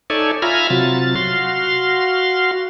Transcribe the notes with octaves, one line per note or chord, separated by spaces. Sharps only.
D#4 A4 C#5 D5 E5 G#5
F4 E5 G#5 A#5 B5 F6
C3 F#3 F4 A6
F#4 F5 C6